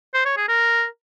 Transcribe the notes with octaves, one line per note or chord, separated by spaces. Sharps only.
C5
C#5
G#4
A#4